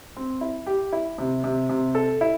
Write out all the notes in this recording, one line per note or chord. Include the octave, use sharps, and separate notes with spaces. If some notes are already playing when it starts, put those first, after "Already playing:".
C4
E4
G4
E4
C3
C3
C3
A4
E4